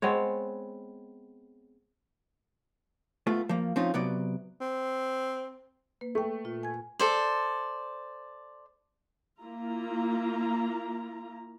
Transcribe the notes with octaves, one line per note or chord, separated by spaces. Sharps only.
G#3 B3 C4 C#5
A3 B3 F4
F3 A#3
F3 C4 C#4 D#4 F4
C3 F#3 B3 D5
C4
A#3 B4
A3 G5 C#6
A#2 F4
G#5 G#6
A4 C5 D5
A#3 E4 F4 A#5